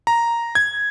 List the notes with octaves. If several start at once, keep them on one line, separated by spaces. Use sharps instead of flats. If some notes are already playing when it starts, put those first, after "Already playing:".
A#5
G#6